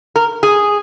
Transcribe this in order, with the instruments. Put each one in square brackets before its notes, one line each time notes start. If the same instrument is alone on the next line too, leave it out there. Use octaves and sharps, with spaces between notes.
[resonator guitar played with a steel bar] A#4
G#4